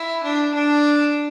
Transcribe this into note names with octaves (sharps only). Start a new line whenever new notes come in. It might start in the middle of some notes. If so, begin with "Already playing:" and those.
Already playing: E4
D4
D4